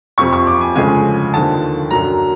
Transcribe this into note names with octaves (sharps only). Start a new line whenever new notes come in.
F2 C3 F3 C#6
C#6
D6
G#5
D2 C#3 F3 G#3 G#5
D#2 D3 F3 A5
F#2 D3 F#3 A#5